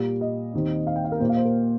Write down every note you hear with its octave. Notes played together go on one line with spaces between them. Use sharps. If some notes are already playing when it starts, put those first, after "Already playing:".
Already playing: A#2 G3 A#3
D#5
D#2 D#3 C4
F5
G5
F5
A#4
A#2 A#3 C5 F5
C5
A#4